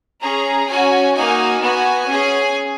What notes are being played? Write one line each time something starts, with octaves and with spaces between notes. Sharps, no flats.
C#4 G#4 A#5
C#4 F#4 G#5
A#3 D#4 F#4 G#5
B3 F#4 G#5
C#4 G#4